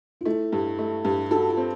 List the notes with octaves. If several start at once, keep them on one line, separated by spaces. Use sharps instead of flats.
F4
A3 E4
G2
A3
G2
F#4 A4
F4
C4